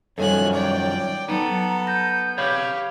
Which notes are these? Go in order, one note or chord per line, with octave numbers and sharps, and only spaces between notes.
F#2 D#3 F3 G3 A4 C#5 G#5 F#6
D5 G5
F#3 B3 D#4 A4 A#5
G6 A#6
G4 C#5 F5 B5